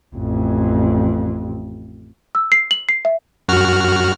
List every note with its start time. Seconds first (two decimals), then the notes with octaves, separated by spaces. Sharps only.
0.15 A1 F2
2.35 E6
2.52 C7
2.71 F#7
2.89 C7
3.05 E5
3.49 F#2 F#4 F6